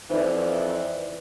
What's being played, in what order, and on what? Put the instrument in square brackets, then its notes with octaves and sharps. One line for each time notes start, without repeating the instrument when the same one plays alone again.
[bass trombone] F2 [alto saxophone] E3 [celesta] D#4 C5 E5 [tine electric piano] B4 D5